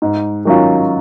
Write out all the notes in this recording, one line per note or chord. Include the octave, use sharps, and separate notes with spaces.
G#2
D#3 F#3 C#4 F4